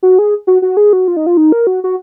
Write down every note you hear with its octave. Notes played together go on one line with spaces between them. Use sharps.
F#4
G#4
F#4
F#4
G#4
F#4
F4
D#4
F4
D#4
A#4
F#4
F#4